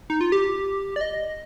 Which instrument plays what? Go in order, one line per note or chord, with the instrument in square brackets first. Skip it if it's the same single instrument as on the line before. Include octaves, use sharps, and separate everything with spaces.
[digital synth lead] D#4
F4
G4
D5
D#5